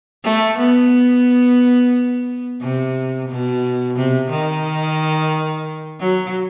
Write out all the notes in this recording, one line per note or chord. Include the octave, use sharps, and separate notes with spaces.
A3
B3
C3
B2
C3
D#3
F#3